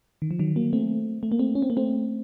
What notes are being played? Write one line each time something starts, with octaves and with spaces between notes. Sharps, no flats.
D#3
F3
D#3 F#3
F#3 A#3
A3 C4
A3
A#3
A3 C4
C#4
C4
A#3
A3 C4